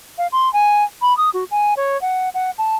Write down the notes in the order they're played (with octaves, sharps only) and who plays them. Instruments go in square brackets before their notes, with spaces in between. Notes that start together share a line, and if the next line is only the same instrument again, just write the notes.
[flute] F5
C6
G#5
B5
D#6
F#4
G#5
C#5
F#5
F#5
A5